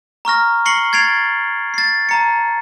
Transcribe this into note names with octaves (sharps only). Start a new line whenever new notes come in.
A#5 C#6 F6 A#6
C#6 A#6 C7 C#7 F#7 G7
G#6 A6 C7 D7 F7
A6 C7
A5 A#5 C#7